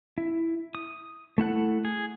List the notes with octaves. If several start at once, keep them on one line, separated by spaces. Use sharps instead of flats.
E4
D#6
A3 E4 F#5 F#6
G#4